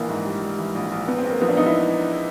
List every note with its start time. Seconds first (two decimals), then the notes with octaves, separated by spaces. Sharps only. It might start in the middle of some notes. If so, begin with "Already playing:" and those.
Already playing: A#1 E3 A#3
0.09 G#2
0.25 G3
0.42 G3
0.58 E3
0.75 A#1
0.92 A#1
1.07 E2 B3
1.18 C4
1.24 E2
1.30 A#3
1.40 F3 B3
1.49 D4
1.57 E2 D#4
1.66 E4